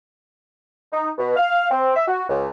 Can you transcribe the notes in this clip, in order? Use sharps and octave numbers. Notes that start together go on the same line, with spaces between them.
D#4
B2
F5
C4
E5
F#4
C#2